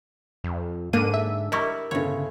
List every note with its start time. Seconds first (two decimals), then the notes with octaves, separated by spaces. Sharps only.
0.44 F2
0.93 G#2 D3 A#3 D4 D#7
1.14 E5
1.52 G3 E4 A#4 D#5 C#6
1.91 G1 A2 C#3 C#5